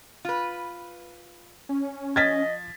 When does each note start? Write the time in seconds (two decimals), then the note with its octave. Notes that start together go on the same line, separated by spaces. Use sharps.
0.25 F4 B4
1.69 C#4
2.16 F3 D#5 G#6 A6 B6